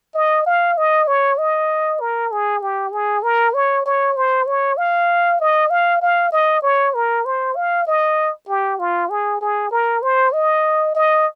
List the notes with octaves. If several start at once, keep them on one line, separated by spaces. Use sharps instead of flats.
D#5
F5
D#5
C#5
D#5
A#4
G#4
G4
G#4
A#4
C#5
C#5
C5
C#5
F5
D#5
F5
F5
D#5
C#5
A#4
C5
F5
D#5
G4
F4
G#4
G#4
A#4
C5
D#5
D#5